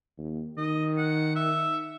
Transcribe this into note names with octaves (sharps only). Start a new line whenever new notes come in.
D#2
D#3 D#5
F#5
E5